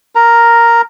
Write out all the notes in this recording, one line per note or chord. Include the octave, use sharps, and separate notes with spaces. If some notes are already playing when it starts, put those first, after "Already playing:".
A#4 A#5